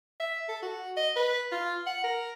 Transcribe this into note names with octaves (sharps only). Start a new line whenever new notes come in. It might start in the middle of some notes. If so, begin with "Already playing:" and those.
E5
A4
F#4
D#5
B4
F4
F#5
A#4